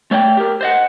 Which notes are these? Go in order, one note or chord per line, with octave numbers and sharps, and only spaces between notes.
A3 C#5 D5 G5
G4 A#4
C5 D#5 F#5